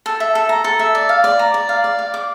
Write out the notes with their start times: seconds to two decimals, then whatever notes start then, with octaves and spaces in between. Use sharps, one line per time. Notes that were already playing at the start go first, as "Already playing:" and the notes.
0.06 A4
0.20 E5
0.35 A4
0.49 A#5
0.64 A4
0.79 E5
0.95 D5
1.09 F5
1.24 D5
1.39 A#5
1.54 D5
1.69 F5
1.84 D5
1.99 F5
2.14 D6